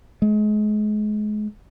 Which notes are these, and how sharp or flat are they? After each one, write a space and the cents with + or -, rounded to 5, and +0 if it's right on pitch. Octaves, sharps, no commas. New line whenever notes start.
G#3 +30